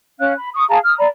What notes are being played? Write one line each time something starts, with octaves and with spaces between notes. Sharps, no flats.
C#4 F5 F#6
B5
C#6 D#6
G#4 F5 A5 A#5
D#6 F6
D5 A#5 B5